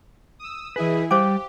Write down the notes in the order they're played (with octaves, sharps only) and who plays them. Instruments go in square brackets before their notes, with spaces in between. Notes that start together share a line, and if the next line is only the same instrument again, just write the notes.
[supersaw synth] D#6 E6
[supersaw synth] E3 E4 G#4 [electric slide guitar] B4 D#5
[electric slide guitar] G3 G5 [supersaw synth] G4 [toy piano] C5 F5 D6